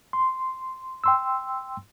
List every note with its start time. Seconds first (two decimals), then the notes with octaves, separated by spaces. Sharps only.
0.13 C6
1.04 G5 C6 E6